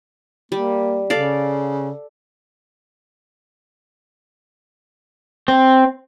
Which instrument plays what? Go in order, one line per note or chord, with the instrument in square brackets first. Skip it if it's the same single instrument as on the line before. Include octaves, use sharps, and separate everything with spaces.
[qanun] G3 [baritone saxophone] A#3
[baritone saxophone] C#3 [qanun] A4 D5 F5
[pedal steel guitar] C4